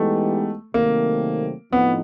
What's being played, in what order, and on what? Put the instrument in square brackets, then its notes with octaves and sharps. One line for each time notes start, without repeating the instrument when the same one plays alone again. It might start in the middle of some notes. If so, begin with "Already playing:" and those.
Already playing: [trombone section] E3 G#3 B3 D#4 G4 [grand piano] A3
[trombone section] C3 D#3 F#3 A3 C4 [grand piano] A#3
[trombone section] A2 F3 C4 D#4 [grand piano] B3